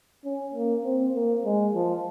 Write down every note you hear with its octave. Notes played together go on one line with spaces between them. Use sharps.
C#4
A#3
C4
A#3
G#3
F3